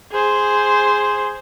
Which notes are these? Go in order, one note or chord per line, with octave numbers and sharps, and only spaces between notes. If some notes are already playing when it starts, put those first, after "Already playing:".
G#4 C5